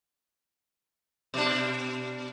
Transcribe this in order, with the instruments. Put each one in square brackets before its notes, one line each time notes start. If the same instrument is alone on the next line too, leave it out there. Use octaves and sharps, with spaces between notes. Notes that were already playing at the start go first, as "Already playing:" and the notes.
[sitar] B2 D4